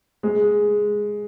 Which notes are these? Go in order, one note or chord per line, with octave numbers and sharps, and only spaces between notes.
G#3